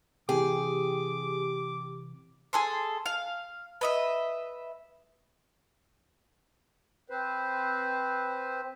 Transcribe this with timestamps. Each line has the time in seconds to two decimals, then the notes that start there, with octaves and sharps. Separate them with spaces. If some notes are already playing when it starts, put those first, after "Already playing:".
0.29 C3 E3 G4 G#4 D6
2.53 G#4 A4 C6
3.06 F5
3.81 B4 D#5 E5
7.10 C4 B4 C5